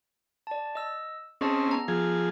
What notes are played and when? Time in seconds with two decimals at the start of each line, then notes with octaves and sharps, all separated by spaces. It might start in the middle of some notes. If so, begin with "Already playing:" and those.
0.47 D5 A5
0.75 D#5 E6
1.41 C4 C#4 G#4 D#5 A5
1.67 B3 A#5
1.88 F3 G#4